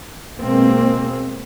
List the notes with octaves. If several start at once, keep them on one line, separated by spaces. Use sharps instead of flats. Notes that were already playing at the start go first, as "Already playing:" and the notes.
B2 G#3 A#3 C4